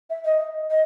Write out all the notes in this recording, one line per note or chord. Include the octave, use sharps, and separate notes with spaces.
E5
D#5
D#5